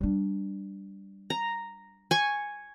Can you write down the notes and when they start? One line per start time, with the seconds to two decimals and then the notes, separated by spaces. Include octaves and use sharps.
0.01 G3 D4
1.30 A#5
2.11 G#5 C#6